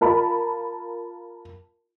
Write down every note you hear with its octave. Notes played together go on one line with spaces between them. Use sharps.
F4 A#4 A5 B5